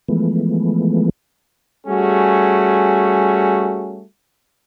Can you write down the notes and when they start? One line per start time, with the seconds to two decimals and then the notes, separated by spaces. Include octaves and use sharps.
0.08 E3 F3 G#3 A3 B3
1.87 G3 A3 C#4 F#4 G#4